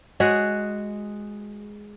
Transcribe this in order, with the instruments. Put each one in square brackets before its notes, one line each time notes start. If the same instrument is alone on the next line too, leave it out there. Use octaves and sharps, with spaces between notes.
[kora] G#3 F#4 G#4